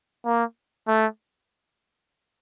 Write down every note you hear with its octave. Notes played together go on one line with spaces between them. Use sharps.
A#3
A3